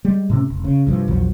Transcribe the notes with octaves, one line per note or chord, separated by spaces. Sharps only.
G3 G#3
A2 C3 C#4
F1
C#3
C2 G2 F3
A#1 E2 F3 F#3